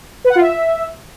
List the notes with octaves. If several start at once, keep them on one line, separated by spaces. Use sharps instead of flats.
B4
F#5
F4
E5